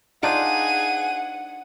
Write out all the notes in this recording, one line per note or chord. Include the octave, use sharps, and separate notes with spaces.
D4 D#4 F4 G#4 F#5 D#7